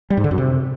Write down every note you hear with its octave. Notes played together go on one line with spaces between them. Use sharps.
G3
G#2
D3
F#2
C3